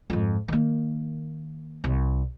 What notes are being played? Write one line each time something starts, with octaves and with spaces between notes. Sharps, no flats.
F2 G#2
D#3 A#3
C2